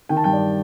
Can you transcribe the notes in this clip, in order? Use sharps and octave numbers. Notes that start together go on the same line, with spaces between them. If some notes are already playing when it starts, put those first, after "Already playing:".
D#3 G5
A5
G2 G5
D5